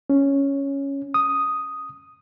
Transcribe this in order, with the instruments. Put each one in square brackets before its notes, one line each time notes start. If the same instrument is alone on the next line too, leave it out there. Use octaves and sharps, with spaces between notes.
[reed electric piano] C#4
D#6